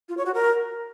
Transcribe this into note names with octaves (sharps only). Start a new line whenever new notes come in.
F4
C#5
F#4
A#4